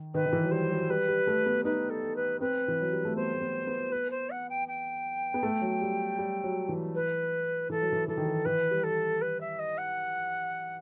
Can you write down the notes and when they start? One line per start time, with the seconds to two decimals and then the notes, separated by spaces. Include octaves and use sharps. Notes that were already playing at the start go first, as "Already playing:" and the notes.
Already playing: D#3
0.14 D#3 B4
0.26 D#3
0.33 E3
0.43 F#3
0.51 G3 C5
0.71 F#3
0.90 G3 B4
1.08 G3
1.27 A3
1.46 B3
1.65 D#4 B4
1.90 A4
2.16 B4
2.41 C4 B4
2.68 E3
2.81 F#3
2.92 G3
3.05 A3
3.16 B3 C5
3.34 A3
3.41 B3
3.67 B3
3.92 B4
4.10 C5
4.30 F#5
4.49 G5
4.68 G5
5.34 B3
5.43 A3
5.62 F#3
5.82 G3
6.19 G3
6.44 F#3
6.69 E3
6.95 B4
7.70 E3 A4
7.82 F#3
7.93 E3
8.08 E3 A4
8.17 D#3
8.26 E3
8.45 E3 B4
8.71 G3
8.83 A4
9.21 B4
9.40 E5
9.59 D#5
9.78 F#5